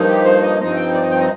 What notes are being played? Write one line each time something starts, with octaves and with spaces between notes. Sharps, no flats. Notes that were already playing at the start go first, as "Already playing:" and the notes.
Already playing: G2 F3 A#3 D#4
G4
C5
D#5
G2 F3 C4 D#4 D#5
G5
D5
D#5
G5
D#5